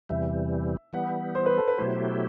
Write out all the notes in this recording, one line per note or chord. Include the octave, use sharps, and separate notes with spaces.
E2 C3 E3 G3 E5
E3 G3 B3 F#5
C5
B4
A4
B4
B2 F#3 A3 E4 G4 C5